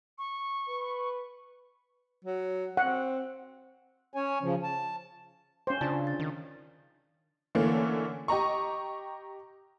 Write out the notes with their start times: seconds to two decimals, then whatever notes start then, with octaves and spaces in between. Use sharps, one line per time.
0.18 C#6
0.69 B4
2.24 F#3
2.77 C4 F#5
4.14 C#4 C#5 G#5
4.42 C#3 F3
4.63 A5
5.67 C#4 C5
5.81 C#3 D4 F4 D5 A5
6.07 A6
6.19 D#3
7.55 D3 E3 A3 A#3 C#4
8.28 G4 D#5 A#5 C#6